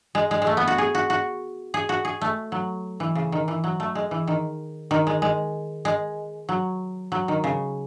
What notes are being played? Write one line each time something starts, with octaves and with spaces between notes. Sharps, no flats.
G#3
G#3
G#3
A3
B3
F#4
G#4
F#4
F#4
G#4
F#4
G#4
A3
F#3
E3
C#3
D#3
E3
F#3
A3
G#3
E3
D#3
D#3
G#3
G#3
G#3
F#3
F#3
D#3
C#3